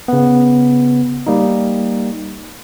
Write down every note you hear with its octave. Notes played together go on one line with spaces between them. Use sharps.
C#3 B3
G3 A#3 D#4